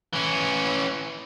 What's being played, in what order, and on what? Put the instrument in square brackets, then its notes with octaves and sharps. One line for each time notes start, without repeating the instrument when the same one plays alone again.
[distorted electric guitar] E3 C#4